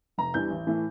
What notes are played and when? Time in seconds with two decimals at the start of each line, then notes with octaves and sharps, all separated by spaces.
0.18 F1 A#5
0.34 E2 E3 G3 D4 G6
0.50 A1
0.67 A2 E3 A3